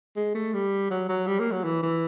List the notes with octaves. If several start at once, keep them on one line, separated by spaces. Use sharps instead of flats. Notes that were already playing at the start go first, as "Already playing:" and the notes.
G#3
A3
G3
F#3
F#3
G3
A#3
F#3
E3
E3